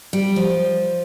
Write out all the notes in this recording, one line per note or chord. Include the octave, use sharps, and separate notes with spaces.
G3
F3